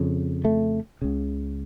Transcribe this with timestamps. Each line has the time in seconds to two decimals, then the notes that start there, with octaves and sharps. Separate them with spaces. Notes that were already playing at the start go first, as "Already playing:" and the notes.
Already playing: F2 C#3
0.45 A3
1.02 C#2 C#3